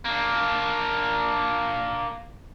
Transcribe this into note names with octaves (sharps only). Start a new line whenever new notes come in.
A#3 D4